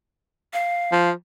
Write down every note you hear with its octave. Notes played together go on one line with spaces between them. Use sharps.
F5
F3